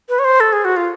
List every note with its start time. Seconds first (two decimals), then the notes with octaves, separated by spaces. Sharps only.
0.09 B4
0.19 C#5
0.25 C5
0.40 A4
0.53 G#4
0.65 F#4
0.77 F4